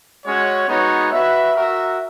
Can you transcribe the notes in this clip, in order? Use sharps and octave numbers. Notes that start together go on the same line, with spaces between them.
G#3 C#4 F#4 C#5
G#3 B3 D#4 F#4 C#5
F#4 B4 E5
F#4 A#4 E5